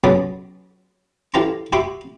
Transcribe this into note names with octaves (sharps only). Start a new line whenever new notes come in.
C#2 F#3 G#3 B3 D5 B5
D3 E3 G4 F5 A#5 C6
F#4 G4 E5 B5 C6 D6